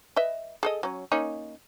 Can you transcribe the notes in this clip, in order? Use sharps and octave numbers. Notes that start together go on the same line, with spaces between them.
B4 D#5 E5
G#4 A4 D#5
F#3 C#4
A#3 C#4 D#4